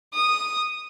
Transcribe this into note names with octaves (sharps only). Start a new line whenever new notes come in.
D#6